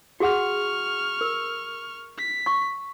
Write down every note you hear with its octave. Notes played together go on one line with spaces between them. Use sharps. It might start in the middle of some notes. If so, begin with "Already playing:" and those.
F#4 G#4 F#5 C#6 F6
A#4
B6
C#6